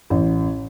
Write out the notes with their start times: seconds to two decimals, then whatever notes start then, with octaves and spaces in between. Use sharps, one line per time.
0.10 A1